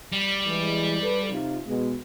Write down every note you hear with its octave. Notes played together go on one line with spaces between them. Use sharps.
G3
E3 G#3
A4 B4
C3 D#4 F4
B2 G#3